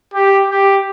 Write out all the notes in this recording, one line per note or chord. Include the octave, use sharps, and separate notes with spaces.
G4
G4